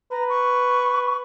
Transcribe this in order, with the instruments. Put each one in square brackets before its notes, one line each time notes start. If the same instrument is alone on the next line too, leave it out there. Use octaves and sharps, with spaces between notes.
[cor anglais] B4 [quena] A#5
[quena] C#6